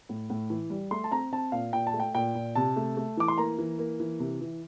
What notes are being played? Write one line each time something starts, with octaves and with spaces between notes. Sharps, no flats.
A2
A2
E3
G3
A3 C6
A5
C4 A#5
C4 A5
A#2 F5
A#2 G5
A5
A3
G5
A#2 G5
A#2
C3 A5
A3
A3
E3 D6
C6
A#3 A#5
E3
A#3
E3
C3
E3